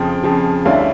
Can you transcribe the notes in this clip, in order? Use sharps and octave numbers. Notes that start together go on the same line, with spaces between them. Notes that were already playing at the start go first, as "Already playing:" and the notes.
Already playing: F2 C#3 F3 G5
F2 C#3 F3
D2 D3 G3 C#4 E4 F5